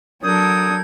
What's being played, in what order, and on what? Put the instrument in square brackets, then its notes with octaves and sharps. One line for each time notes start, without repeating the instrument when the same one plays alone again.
[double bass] F#3 [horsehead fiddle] D4 A4 [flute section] A#4 G6 G#6 [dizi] D#6